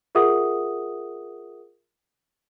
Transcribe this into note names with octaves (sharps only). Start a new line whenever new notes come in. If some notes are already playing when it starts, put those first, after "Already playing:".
F4 G#4 A#4 E5 F#5 D#6